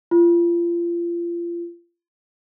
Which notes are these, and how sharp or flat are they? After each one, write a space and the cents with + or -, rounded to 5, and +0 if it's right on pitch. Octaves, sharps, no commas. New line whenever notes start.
F4 -30